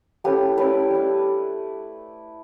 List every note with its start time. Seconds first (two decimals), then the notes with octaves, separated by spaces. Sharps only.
0.24 A3 C#4 E4 G4 B4
0.58 A3 C#4 E4 B4 D5
0.91 G3 D4